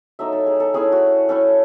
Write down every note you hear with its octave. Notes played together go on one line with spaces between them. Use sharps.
F#3 A3 D#4 E5
A4
G#4
A4
A3 C#4 E4 G#4
F#4
A3 C#4 E4 A4